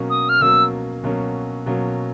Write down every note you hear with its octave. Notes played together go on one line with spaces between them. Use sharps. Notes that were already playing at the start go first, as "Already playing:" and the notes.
Already playing: B2 F#3 A#3 C#4
D#6
F6
B2 F#3 A#3 C#4 E6
B2 F#3 A#3 C#4
B2 F#3 A#3 C#4